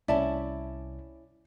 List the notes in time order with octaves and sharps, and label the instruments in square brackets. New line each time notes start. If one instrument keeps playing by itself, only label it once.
[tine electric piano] C2 [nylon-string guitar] C#4 E4 [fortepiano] D5 [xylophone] E5 A5